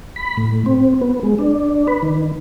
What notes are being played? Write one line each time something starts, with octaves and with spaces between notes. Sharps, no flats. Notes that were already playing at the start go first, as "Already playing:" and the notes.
B5
A2
C4
B3
G#3
D4
B4
D#3